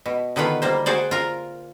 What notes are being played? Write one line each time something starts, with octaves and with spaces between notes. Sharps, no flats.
B2
D3 D#3 B3 F4 B4
G3 A#3 C5
F#4 G#4 C5 D5
F4 A#4